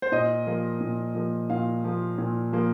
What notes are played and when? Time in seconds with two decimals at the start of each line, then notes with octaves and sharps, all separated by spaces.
0.02 C5
0.12 A#2 D#5
0.47 F3 A#3
0.81 A#2
1.15 F3 A#3
1.50 A#2 F5
1.84 F3 A#3
2.18 A#2
2.53 F3 A#3